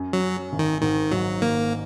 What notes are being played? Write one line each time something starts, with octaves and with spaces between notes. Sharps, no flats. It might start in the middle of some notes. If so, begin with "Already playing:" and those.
Already playing: F#2
F#3
C#4
G#1
D#3
G#2 D#3
G#2 F#3
D#3 A#3